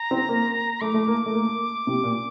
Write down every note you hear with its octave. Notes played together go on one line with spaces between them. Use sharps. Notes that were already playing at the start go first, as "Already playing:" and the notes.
Already playing: A#5
C4
A#3
A3 D6
A3
A#3
A3
A#3
C3
A#2